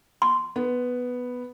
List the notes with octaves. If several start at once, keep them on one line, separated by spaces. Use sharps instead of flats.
C6
B3